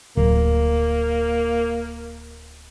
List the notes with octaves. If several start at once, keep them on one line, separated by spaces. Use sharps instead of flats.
D1 A#3